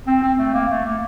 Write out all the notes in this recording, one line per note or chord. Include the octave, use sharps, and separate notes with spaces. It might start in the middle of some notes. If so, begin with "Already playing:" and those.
C4
C4
A3
A#3
A3
A#3